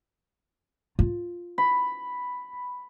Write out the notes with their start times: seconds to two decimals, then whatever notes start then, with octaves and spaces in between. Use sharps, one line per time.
0.99 F4
1.58 B5